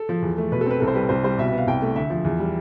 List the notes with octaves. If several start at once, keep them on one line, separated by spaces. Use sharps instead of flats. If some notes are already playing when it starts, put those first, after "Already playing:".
Already playing: A4
F3
E2
A3
B2 B4
A4
C4 B4
C2 A4
C5
G3 B4
C2 C5
G3 C5
B2 E5
B3 E5
F5
C2 G5
A3
D2 E5
F3
E2
G3